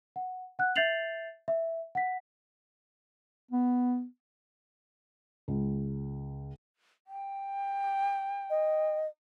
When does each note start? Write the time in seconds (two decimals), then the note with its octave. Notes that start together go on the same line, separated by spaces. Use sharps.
0.16 F#5
0.59 F#5 F#6
0.76 E5 G6 A6 C7 F7 F#7
1.48 E5
1.95 F#5 B6
3.51 B3
5.48 C#2
7.07 G5
8.50 D#5